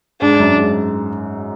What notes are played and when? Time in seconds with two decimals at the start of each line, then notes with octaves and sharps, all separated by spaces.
0.21 G#2 D4
0.40 F#2
0.58 G#2